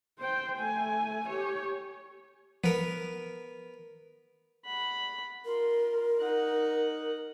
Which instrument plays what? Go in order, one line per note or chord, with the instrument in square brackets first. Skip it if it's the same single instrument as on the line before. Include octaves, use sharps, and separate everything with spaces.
[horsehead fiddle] C5 G5
A3 G#5
G4 C#5
[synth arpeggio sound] F3 [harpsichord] B3 A#4
[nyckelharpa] F#5 B5
[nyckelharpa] F4 C6 [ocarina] A#4
[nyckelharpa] D#4 F#5